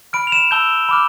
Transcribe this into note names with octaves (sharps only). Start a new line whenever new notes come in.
B5 F6 D7
F7
E7
A5 E6 G6 G7
B5 D6 F6